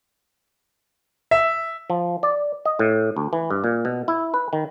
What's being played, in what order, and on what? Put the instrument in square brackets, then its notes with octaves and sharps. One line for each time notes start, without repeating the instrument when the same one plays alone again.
[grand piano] E5
[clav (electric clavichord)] F3
D5
D#5
A2
D2
E3
G2
A#2
B2
E4
B4
D#3